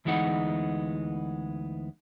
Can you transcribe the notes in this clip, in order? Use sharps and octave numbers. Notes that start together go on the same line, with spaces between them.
D2 E3 G#3 B3 D#4 F#5